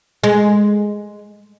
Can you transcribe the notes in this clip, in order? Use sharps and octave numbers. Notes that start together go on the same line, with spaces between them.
G#3